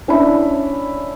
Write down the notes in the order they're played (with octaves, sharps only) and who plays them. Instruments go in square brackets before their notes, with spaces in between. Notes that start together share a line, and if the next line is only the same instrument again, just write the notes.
[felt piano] C#4 D4 E4 D5 E5 B5